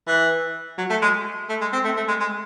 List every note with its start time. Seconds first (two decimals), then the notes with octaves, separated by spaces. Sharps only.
0.07 E3
0.78 F#3
0.90 A3
1.02 G#3
1.49 A3
1.61 G#3
1.73 C4
1.84 A3
1.97 A3
2.08 G#3
2.20 G#3